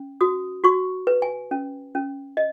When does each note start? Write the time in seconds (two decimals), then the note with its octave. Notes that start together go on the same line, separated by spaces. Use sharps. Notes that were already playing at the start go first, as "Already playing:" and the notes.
Already playing: C#4
0.21 F#4 D#6
0.64 F#4 C#6
1.07 B4
1.22 G#5
1.51 C#4
1.95 C#4
2.37 D#5